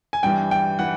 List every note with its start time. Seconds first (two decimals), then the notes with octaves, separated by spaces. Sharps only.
0.13 G#5
0.23 G2 E3 G5
0.51 G5
0.79 E3 F#5